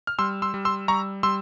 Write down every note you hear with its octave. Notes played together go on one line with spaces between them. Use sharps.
F6
G3 C6 E6
C6 E6
G3
C6 E6
G3 A#5 C#6
G3 C6 E6